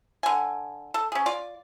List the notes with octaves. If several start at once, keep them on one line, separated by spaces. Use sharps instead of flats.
D3 G#5
A4
C#4 G#4
F4 D5